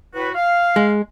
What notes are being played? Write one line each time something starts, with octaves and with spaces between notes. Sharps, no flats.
A2 F#4 B4
F5
G#3